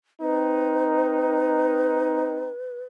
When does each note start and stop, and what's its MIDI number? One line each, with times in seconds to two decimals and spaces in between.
0.21 2.49 60
0.21 2.49 63
0.21 2.80 71